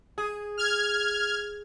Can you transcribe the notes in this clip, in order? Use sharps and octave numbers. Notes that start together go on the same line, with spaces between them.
G#4
F6 G#6